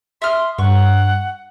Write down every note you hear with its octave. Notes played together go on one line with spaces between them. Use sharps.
E5 C6 D#6 F6
G2 F#5 C#6